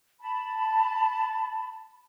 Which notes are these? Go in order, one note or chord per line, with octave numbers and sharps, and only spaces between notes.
A5 B5